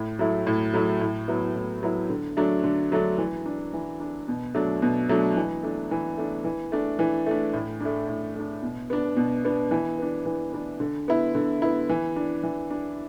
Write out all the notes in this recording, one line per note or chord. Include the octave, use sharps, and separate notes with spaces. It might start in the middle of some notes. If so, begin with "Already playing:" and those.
Already playing: A2
F#3 A3 E4
A2
F#3 A3 E4
A2
F#3 B3 E4
A2
F#3 B3 E4
D3
F#3 A3 D4
D3
F#3 A3 D4
E3
D4
E3
D4
B2
F#3 A3 D4
B2
F#3 A3 D4
E3
A3 D4
E3
A3 D4
E3
A3 D4
E3
A3 D4
A2
A3 D4
A2
A3 D4
B2
B3 D4
B2
B3 D4
E3
B3 D4
E3
B3 D4
D3
B3 E4
D3
B3 E4
E3
D4
E3
D4